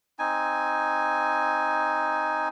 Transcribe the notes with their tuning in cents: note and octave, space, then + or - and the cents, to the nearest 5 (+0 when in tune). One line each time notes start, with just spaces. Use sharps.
C4 +5 D#4 +0 G#5 +0